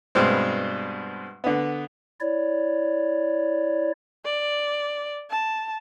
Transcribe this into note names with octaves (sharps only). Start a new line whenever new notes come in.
G2 B2 G3 G#3 C4
D3 B3
E4 C#5 D5
D5
A5